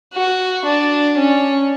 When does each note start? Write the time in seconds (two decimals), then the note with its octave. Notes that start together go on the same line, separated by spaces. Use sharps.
0.13 F#4
0.65 D4
1.17 C#4